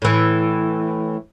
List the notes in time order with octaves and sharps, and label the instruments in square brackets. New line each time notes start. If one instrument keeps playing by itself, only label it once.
[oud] A2 E3